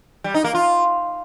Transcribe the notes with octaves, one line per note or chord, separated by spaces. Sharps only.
G3
D#4
A#3
F4